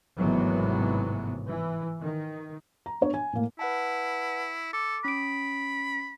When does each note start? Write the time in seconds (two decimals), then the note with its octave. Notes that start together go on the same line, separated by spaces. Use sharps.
0.18 G#1 A2 C3 E3 F#3 B3
1.48 E3
2.01 D#3
2.86 A#5
3.01 B3 D4 C#5
3.14 G#5
3.33 A2 A#3
3.59 E4 B4 F#5 A5
4.73 A4 D6
5.05 C#4 B5 D7